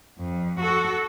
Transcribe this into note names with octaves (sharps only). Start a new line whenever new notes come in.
F2
F#4 A4